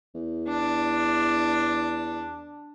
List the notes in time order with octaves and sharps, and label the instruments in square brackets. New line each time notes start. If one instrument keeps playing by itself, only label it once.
[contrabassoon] E2
[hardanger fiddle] D4